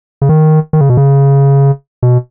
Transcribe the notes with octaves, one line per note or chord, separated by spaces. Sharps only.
C#3
D#3
D#3
C#3
B2
C#3
B2